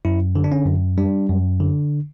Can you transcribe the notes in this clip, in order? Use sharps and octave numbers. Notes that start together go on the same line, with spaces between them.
F#2 E4
D3
D4
C#4
F#2
G3 D4
F#2
D3